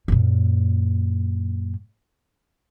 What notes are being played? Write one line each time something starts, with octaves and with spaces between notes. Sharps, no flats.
F#2 A#2